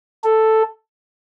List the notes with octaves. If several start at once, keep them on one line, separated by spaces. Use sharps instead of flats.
A4